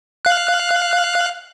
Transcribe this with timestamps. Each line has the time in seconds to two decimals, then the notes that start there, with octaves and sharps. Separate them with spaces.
0.25 F5 F#6